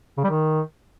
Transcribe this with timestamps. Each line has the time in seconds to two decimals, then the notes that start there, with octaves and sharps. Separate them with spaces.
0.18 C#3
0.24 G3
0.30 D#3